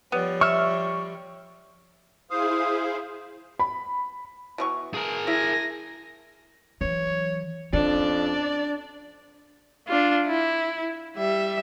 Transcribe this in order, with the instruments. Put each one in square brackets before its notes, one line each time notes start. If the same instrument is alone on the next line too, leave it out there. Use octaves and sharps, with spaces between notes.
[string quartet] F3 G3 C#5 [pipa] B3
[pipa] E5 [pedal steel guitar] C#6 F6
[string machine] E4 G#4 [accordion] C5 F5 [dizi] D#6
[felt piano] B5
[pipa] B2 E3 C#6
[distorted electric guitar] G#4 A#4
[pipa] E4 [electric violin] G#5 A#6
[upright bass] E3 F#3 [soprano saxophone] C#5
[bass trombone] F2 [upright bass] C#4 [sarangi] D4 [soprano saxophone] D5
[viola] D4 F4
E4
G3 E5